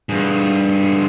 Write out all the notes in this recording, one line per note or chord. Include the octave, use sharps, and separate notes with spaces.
G2 G#4